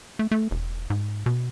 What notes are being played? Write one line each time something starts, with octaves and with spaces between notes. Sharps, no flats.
A3
A3
E1
G#2
B2